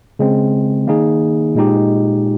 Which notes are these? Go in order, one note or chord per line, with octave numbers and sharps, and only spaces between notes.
C#3 G#3 C4
D#3 A#3 D#4 G#4
A#2 G#3 D#4 G4